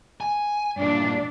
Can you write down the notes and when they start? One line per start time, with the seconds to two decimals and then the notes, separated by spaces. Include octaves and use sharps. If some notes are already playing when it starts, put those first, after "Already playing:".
0.20 G#5
0.77 G2 A#2 D4